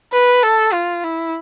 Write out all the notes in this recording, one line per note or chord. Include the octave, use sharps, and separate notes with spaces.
B4
A4
F4
E4